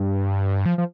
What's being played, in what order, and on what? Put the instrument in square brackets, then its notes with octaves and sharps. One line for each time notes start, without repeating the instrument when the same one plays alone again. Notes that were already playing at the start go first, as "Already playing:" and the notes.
Already playing: [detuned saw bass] G2
F3
F3